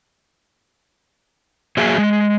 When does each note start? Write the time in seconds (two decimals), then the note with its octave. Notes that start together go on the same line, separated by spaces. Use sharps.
1.77 F#3 A#3 G#4 E5
1.98 G#3